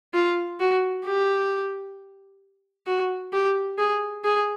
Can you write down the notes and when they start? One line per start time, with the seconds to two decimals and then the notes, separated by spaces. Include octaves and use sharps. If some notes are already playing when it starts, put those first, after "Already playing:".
0.13 F4
0.60 F#4
1.05 G4
2.86 F#4
3.33 G4
3.78 G#4
4.24 G#4